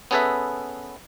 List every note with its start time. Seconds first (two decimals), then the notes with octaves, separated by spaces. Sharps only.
0.11 B3 C#4 G#4 A4 B4 E5